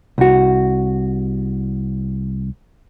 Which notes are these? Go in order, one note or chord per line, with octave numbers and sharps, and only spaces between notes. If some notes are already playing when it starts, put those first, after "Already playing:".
C2 F#4